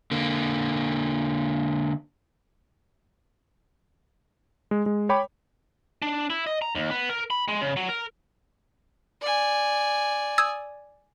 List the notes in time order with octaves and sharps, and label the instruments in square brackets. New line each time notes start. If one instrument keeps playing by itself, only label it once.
[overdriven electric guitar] D3 A#3
[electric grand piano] G#3
G#3
C#5 G5 B5 D6
[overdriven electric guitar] D4
E4
D#5
A#5
D#2
B3
A#4
B5
G#3
C#3
F#3
A#4
[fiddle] D5 G#5
[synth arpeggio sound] D#6 E6 G#6